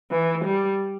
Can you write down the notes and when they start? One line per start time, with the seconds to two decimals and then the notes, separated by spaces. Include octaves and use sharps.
0.11 E3
0.45 G3